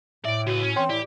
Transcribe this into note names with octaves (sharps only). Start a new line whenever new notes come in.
A2 D5 E5 D7
C#3 F#4 B4
C#4
E3 C4 C#5 G5 C6
A2 E3 E4 G4 D5